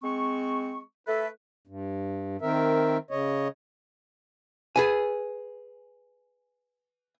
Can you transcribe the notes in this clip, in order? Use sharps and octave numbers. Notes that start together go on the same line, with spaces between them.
G#3 C4 C#6
A3 A4 B4 E5
G2
D#3 C4 A#4 E5
C#3 C#5 D#5
G#4 B4 G#5